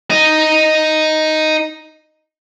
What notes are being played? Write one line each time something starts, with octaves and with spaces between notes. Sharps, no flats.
D#4 D#5